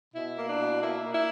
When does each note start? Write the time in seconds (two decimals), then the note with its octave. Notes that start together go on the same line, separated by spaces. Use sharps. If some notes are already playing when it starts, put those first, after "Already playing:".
0.15 B2 E4
0.37 A#3
0.48 D4
0.59 B2
0.81 A#3 E4
1.03 A#3
1.13 E4